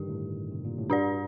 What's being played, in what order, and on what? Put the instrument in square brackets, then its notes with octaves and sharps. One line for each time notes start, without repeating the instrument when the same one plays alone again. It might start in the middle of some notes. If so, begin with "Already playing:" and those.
Already playing: [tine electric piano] G2 D3 D#3 [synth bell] G4
[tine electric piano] A2
C3
A#2
A2
[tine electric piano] G2 [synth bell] D4 G4 D5